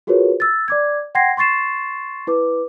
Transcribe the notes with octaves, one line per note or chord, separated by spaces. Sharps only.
F4 F#4 G#4 A#4 B4 C#5
E6 A6
D5 D6 G#6
F#5 G5 C6 G#6 A#6 C7
C6 C#6 A6 C7 E7
E4 B4 D6